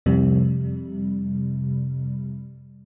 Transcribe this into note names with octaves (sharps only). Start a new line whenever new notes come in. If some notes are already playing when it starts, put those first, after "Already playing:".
F2 C3 G3